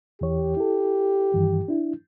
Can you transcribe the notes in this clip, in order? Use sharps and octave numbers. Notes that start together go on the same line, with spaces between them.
E2 E3 G4 C#5
E4 A4
G2 D#3 E3
D4 E4